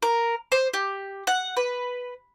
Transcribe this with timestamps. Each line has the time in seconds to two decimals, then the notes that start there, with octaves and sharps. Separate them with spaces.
0.02 A#4
0.52 C5
0.74 G4
1.27 F#5
1.57 B4